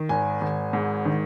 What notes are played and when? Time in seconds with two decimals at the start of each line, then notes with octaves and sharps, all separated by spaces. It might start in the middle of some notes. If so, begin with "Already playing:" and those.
Already playing: D#3
0.09 G#1 G#5
0.41 G#1
0.73 G#2
1.05 D#3